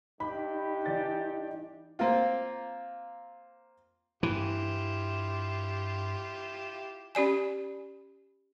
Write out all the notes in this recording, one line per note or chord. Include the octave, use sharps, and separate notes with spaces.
G2 D#4 G4 B5
E3 D5 A6
A#3 C4 F4
G2 E3 E4 F4 G4
C#4 G4 D5 G#5